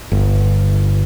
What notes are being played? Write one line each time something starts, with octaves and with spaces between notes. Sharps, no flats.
G1